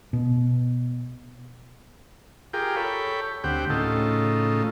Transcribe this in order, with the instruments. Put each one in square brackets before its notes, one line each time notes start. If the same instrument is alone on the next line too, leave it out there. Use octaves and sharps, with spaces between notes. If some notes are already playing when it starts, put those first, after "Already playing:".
[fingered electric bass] B2
[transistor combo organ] F4 G4 G#4 A#4 G5
A4 C#5 G5 B5
D2 C4 G4 F#5 G5
A2 C#3 D#4 F4 A4